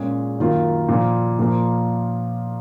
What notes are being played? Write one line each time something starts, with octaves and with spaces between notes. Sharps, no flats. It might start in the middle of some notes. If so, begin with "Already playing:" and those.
Already playing: A#2 G#3 C#4 G#4
F#2 D#3 A#3 F4
A#2 F3 A#3
A#2 F3 A#3